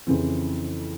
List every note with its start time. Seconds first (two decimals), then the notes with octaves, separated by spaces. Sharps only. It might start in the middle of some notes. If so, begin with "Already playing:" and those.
0.07 F2 C#3 E3 C4